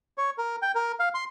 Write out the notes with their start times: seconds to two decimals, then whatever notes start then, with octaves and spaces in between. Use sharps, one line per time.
0.18 C#5
0.38 A#4
0.62 G5
0.75 A#4
0.99 F5
1.14 C6